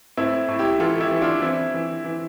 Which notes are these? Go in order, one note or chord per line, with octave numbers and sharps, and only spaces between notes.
A2 C4 E4
A2
E4 G4
E3 F4 A4
E4 G4
E3
D4 F4
E3 C4 E4
E3
E3